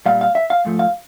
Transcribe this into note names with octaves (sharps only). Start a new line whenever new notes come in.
A#2 G3 F5
F5
E5
F5
G#2 F3 A3
F5